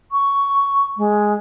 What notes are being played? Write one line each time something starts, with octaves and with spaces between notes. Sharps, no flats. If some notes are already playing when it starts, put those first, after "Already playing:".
C#6
G#3